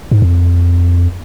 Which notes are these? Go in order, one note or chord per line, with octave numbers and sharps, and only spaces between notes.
G#2
F2